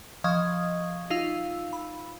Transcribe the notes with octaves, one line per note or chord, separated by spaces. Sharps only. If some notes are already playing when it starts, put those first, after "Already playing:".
F3 D#5 F5 C#6 D#6 G#6
D#4 F4 F5 E6
B5